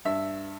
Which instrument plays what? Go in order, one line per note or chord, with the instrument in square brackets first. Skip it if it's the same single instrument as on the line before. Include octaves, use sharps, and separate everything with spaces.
[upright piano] G2 E5